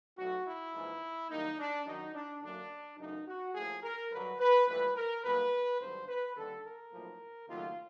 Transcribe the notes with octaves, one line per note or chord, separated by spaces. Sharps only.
B1 A2 F#3 A3 F#4
E4
A#1 G#2 E3
F#2 D#3 G3 A#3 D#4
D4
F#2 D#3 F#3 D#4
D4
F#2 D3 F#3 A#3 D4
F#2 C#3 E3 A3 D#4
F#4
A2 F3 A#3 G#4
A#4
G2 D3 F#3 B4
B4
A#1 A2 E3 G3 B4
A#4
B1 B2 G3 A#3 B4
G#1 G2 D3 F#3 B3 C5
B4
D#2 D3 G3 A4
A#4
B1 A2 F3 A#3
D#2 C#3 F#3 A3 F4